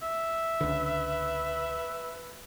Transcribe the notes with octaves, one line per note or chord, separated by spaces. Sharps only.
E5
C#2 D3 B4